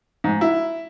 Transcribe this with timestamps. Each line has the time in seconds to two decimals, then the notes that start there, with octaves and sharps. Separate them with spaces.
0.24 G#2
0.41 E4